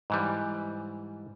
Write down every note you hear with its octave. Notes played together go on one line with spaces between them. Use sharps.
G#2 E3 G3